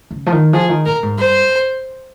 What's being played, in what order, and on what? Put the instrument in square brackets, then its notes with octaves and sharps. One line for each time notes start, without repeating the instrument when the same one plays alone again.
[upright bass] C#3
F3
D#3
[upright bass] F3 [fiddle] G#4
[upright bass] D#3
[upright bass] A#2 [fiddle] A#4
[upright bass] G#2
[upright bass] G2 [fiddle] C5